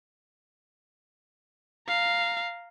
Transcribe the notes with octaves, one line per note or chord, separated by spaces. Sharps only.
F5 A#5